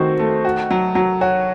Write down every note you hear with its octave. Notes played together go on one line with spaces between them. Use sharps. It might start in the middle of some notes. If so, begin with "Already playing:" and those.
Already playing: D#3 A3 C4 F#4 C5
A3
F#4
F#3
F#3
F#4 C#5